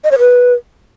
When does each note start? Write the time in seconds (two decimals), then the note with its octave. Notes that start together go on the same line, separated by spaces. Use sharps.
0.04 D#5
0.12 C#5
0.19 B4